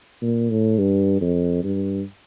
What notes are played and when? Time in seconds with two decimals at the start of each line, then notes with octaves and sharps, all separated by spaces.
0.21 A#2
0.50 A2
0.78 G2
1.21 F2
1.64 G2